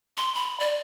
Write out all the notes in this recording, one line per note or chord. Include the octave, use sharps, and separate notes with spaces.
C6
B5
D5